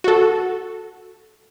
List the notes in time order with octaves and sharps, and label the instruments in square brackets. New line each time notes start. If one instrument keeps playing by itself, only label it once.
[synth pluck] F#4 A4